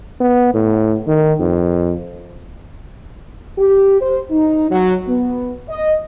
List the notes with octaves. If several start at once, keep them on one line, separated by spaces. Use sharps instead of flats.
B3
A2
D#3
F2
G4
C5
D#4
F#3
B3
D#5